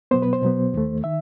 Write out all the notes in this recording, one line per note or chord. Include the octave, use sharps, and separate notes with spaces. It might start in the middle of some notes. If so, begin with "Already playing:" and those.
B2 F#3 B3 C5
B4
C5
B2 F#3 B3
D#2 D#3 A3
D#3 E5